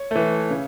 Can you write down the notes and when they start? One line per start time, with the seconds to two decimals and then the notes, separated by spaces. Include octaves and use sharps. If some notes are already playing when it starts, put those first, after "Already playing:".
Already playing: C#5
0.11 E3 A3
0.50 C#3